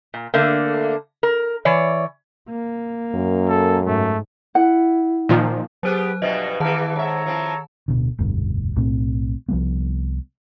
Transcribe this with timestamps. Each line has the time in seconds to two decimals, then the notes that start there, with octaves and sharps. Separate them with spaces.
0.14 A#2
0.34 D3 A3 A#3
1.23 A#4
1.65 E3 C#5 D5
2.50 A#3
3.15 F#2
3.48 A4
3.86 G#2 A3
4.55 E4 F#5
5.29 A#2 D#3 F3
5.83 F#3 B3 G4 G#4 C5 F#6
6.22 G2 B2 F3 D#5 E5
6.60 E2 D#3 E3 E4 G4 A#4 A5
6.96 G#2 A4 C#5 E5 A#5
7.26 F3 C4 E4
7.88 D1 B2 D3
8.18 F1 D2 G2 B2
8.76 B1 A2 A3 C4
9.49 C2 F3 G3 B3